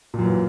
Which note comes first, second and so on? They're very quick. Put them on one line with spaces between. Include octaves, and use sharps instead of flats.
A#2 F#2 E3